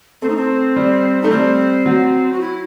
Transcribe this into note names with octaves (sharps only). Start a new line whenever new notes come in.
A3 C4
D#4
C4
G3
A3 D#4
G3 C4
F#3
F#4
E4